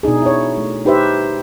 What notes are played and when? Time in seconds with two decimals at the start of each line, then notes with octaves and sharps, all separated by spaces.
0.03 B2 D4 D#4 G#4
0.22 E4 C#5
0.57 A3
0.85 D#4 G4 B4 C5 E5